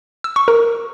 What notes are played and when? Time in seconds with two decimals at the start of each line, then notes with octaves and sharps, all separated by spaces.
0.24 E6
0.36 C#6
0.48 A#4